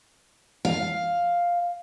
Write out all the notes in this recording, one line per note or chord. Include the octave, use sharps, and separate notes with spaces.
F5